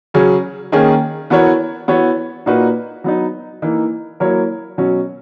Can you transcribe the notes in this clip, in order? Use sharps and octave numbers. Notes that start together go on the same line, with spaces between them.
C#3 F#3 C#4 G#4
D#3 A#3 C#4 G#4
E3 B3 F#4 A#4 C#5
E3 B3 F#4 C#5
A#2 A#3 D#4 F#4 B4
F#3 B3 D#4
E3 A#3 D#4
F#3 A#3 E4 A#4 C#5
B2 F#3 C#4